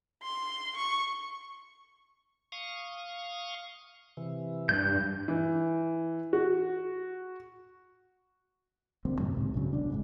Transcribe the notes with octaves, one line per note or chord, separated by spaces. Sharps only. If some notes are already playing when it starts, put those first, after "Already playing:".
C6
C#6
F5 C#6 D#6
C3 E3
G2 F#6 G6
E3
F#4
D2 G3 A#3 C4
F#2 A2 C3 D#3
C#2 A2 C3
B1 G2 C#3 F#3
F1 B2 D4
G1 G#2 C#3